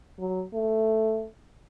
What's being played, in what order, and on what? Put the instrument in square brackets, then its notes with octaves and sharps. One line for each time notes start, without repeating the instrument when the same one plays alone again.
[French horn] F#3
A3